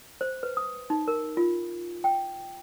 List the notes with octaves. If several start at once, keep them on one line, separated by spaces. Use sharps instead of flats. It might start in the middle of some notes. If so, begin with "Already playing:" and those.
C5
B4
D#6
D#4
A#4
F4
G5